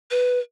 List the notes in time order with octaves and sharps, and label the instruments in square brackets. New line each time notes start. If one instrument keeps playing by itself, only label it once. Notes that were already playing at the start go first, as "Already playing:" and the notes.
[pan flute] B4